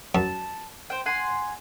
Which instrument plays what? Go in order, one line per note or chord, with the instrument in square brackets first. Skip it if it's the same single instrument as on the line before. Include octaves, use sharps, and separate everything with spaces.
[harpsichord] F#2 [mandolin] A5
[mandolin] C5 G5
F#5 G#5 C6